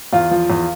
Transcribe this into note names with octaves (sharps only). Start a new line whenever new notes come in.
E2 F4
F3
E2